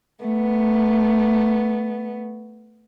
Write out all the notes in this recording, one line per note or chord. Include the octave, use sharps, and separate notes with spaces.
A3 B3